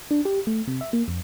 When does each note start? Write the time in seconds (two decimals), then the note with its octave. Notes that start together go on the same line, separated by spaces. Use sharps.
0.11 D4
0.25 G4
0.47 A3
0.67 C3
0.81 E5
0.93 A#3
1.08 F2